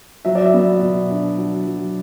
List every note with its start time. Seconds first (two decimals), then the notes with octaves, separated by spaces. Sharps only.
0.25 F#3 E5
0.35 D5
0.46 E5
0.54 B3
0.81 B2
1.11 D4
1.38 F#3
1.67 F#3